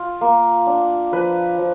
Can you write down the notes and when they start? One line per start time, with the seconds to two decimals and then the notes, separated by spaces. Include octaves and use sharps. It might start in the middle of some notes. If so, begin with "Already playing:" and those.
Already playing: F4
0.21 A#3
0.67 D4
1.12 F3 B4
1.58 F3